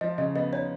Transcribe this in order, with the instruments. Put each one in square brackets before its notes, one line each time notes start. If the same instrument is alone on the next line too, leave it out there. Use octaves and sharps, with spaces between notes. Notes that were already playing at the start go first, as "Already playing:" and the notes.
[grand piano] F3 [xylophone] D#5
[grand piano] C#3 [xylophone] D#5
[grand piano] B3 [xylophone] D#5
[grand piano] D#4 [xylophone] C#5